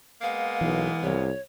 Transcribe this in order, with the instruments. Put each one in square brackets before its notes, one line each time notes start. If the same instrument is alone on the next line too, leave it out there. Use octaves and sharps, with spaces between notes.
[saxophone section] G#3 A#3 B3 [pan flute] F5
[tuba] B1 [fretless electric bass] E3
[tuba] C2 [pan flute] C#5